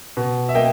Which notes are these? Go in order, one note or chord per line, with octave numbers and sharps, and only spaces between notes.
B2
E5
A#3 D#5 G5